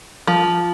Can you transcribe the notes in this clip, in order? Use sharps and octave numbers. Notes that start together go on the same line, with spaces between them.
F3